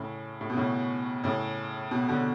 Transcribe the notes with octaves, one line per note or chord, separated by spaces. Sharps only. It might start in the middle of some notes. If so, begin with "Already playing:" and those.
Already playing: A2 C#3
A2
B2
A2 C#3
A2 C#3
B2
B2 D3